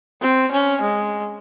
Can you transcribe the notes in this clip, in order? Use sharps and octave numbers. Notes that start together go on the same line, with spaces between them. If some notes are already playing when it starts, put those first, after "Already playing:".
C4
C#4
G#3